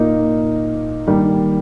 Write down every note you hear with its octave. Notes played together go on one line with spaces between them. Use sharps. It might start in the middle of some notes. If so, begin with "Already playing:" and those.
Already playing: A#2 A#3 D#4
D#3 G3 A#3